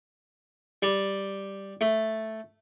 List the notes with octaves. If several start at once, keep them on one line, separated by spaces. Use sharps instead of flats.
G3
A3